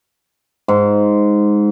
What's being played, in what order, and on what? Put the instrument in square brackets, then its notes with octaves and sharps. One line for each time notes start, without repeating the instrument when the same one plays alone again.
[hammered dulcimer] G#2